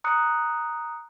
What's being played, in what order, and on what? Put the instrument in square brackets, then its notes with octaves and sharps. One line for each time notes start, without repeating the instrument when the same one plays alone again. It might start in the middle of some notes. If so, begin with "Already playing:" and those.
[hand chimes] A#5 D#6 F#6 C#7